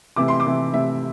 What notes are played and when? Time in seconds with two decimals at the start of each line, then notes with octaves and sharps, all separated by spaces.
0.16 C3 E3 A3 D6
0.28 C6
0.40 D6
0.45 C3 E3 A3
0.73 C3 E3 A3 E5